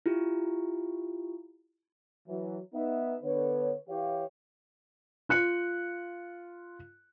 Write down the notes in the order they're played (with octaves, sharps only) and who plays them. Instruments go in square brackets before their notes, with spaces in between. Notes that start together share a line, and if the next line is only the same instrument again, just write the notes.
[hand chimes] E4 F4 G4
[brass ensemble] E3 F#3
B3 D#4 E5
D3 B3 B4 C#5
E3 G4 C#5 F5
[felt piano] F4 F#6 C#7